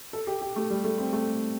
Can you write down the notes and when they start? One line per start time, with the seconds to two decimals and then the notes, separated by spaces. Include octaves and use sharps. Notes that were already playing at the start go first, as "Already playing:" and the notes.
0.13 A4
0.27 G4
0.42 G4
0.56 A3
0.70 G3
0.84 A3
0.98 C4
1.13 A3